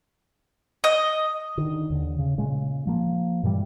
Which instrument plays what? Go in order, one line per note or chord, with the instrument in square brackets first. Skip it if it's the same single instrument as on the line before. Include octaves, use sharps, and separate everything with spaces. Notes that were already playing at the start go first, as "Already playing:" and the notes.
[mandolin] D#5
[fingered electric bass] D3 D#3
D#2 D3
C#3
A#2 C#3 G#3
F3 A#3
G2 A#2 E3 G3